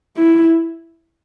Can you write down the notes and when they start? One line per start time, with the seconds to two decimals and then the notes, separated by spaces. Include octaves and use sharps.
0.17 E4